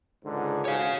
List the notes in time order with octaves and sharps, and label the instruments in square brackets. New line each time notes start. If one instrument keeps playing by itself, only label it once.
[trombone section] C#2 G#2 D3
[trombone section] G#2 F#4 G#4 [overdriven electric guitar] C#5 F5